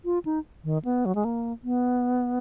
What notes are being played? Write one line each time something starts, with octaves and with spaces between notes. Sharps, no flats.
F4
D#4
D#3
B3
F#3
G#3
A#3
B3